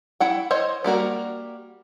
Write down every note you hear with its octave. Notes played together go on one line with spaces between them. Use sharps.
E4 F#5 G5
C5 C#5 D#5
G3 A#3 F#4 A#4